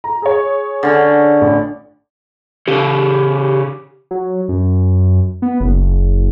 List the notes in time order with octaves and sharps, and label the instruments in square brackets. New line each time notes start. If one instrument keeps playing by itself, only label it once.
[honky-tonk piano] A#5
G#4 C#5
[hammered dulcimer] D3 C#4
[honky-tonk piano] A1
[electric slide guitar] C#3 C#4 A4 [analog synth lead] G4
[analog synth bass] F#3
F#2
B3
F#1
F#1